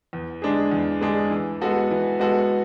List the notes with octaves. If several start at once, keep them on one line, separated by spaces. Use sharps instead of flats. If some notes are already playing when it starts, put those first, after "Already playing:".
E2
D3 G#3 D4 G#4
E2
D3 G#3 D4 G#4
E3
G#3 B3 F#4 A4
E3
G#3 B3 F#4 A4